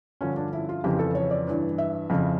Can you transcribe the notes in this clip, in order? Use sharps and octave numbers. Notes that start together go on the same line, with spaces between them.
G2 D3 F3 C#4
D4
E4
F4
F2 C#3 E3 G4
A4
C#5
D5
G2 E3
E5
F2 C#3 F3